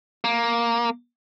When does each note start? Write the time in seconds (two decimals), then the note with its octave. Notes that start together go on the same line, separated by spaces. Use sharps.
0.24 A#3